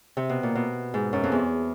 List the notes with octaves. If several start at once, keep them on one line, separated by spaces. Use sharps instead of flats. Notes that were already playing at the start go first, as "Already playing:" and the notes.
C3
B2
A#2
B2
G#2
F#2
F2
E2